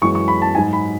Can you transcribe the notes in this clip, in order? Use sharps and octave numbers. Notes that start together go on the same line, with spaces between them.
F#2 E3 G#3 C#6
C#6
B5
A5
G#2 F#3 G#5
B5